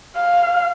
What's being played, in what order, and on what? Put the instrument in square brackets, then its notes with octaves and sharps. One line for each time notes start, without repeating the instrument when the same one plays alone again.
[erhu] F5